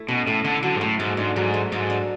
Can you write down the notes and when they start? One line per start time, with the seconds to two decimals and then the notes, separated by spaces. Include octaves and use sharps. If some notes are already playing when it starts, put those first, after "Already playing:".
Already playing: A3 E4 A4
0.08 B2 C#4
0.27 A2 A4
0.44 D3 E4
0.63 D3 F#3
0.76 G#2
0.81 A2 A3
0.99 G#2 A4
1.17 G#2 D4
1.36 G#2 F#3
1.54 A3
1.72 G#2 A4
1.90 D4